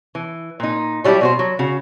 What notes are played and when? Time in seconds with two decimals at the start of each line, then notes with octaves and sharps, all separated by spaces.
0.15 E3
0.60 A#2 D#4
1.04 F#3 G3 D4 E4 G4
1.21 B2 F#4 C5
1.39 F#3
1.59 C#3 F#4